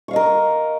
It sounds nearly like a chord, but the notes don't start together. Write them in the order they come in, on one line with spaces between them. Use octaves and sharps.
C#6 F5 D#5 A#4